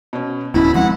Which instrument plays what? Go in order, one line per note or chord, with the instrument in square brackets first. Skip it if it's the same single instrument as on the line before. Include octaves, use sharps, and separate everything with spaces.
[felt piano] B2 C#4
[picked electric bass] D1 C4 C#4 [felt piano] E2 B2 [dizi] E4
[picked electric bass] F3 G#3 C4 [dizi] F#5